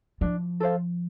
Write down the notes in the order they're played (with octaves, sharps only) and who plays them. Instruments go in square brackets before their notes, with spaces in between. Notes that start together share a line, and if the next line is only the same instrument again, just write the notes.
[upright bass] F3 [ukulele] D4
[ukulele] A4 C5 F5